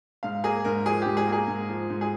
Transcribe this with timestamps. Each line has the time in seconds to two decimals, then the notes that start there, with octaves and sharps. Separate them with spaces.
0.23 G#2 F5
0.44 A#3 G#4
0.65 G#2 A#4
0.86 F3 G#4
1.02 G#2 G4
1.17 G#4
1.27 A#3
1.32 G#4
1.48 G#2
1.69 F3
1.90 G#2
2.01 G#4